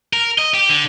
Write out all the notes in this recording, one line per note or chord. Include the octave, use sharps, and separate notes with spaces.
A#4
D#5
G4
D3